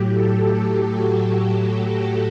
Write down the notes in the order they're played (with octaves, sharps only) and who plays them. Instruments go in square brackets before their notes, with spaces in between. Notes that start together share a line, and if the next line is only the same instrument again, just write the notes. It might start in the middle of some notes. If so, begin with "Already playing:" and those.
Already playing: [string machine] A2 F#3 G4
A4
G4
F#4
F#4
G4
A4